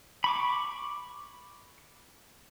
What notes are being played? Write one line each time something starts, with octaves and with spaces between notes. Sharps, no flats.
B5 C#6 D6